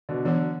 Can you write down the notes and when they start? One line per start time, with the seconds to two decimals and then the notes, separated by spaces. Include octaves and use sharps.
0.09 B2 D3
0.25 D3 E3 F#3 B3 F#4